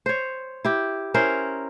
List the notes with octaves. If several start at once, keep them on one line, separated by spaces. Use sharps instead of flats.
C5 C#5
E4 G4
C#4 E4 A#4 C5